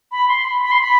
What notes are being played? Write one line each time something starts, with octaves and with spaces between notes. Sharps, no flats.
B5
C6
B5
B5
C6
B5